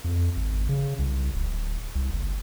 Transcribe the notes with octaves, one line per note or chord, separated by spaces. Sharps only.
F2
G#1
C#3
C2
D1
C2
F#1